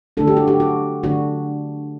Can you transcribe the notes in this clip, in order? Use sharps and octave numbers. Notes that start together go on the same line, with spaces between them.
D3 A3 D4 A4
G4
F#4
G4
F#4
D3 A3 D4 F#4